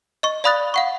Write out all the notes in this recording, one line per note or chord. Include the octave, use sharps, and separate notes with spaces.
D#5 C#6
D5 F5 B5 D#6 F#6 A6
F5 F#5 C#6